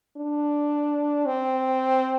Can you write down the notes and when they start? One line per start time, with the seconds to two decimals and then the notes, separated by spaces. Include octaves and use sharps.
0.17 D4
1.26 C4